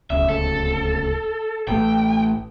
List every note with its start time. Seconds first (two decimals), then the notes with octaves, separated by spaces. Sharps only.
0.10 D1 C#2 E5
0.29 A4
1.67 A1 A3 G5